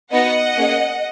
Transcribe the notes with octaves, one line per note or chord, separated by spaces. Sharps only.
B3 D#4 F#4 D#5 F#5
A#3 C#4 G#4